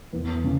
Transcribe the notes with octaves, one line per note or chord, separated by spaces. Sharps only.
E2
C#3